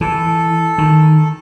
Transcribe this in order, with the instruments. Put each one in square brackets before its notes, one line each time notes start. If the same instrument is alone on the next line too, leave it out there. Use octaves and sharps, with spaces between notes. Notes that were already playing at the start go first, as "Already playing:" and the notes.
[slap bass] E3 [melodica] A4
[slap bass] D#3